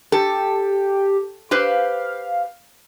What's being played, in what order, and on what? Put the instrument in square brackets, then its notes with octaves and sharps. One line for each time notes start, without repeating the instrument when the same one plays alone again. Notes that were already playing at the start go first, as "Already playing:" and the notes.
[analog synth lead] G4 [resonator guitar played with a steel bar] A4
[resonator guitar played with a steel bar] G4 B4 C5 [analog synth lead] F5